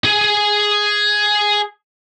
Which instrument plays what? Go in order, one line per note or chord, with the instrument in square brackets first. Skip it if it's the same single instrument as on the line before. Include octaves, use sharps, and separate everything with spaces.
[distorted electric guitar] G#4 G#5